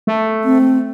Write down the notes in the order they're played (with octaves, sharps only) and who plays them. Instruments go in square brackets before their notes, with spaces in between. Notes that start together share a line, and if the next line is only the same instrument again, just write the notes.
[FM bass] A3
[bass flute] C4